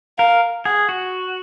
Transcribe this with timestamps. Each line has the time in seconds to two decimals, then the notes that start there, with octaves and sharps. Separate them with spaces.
0.18 A#4 F5
0.65 G#4 F#5
0.89 F#4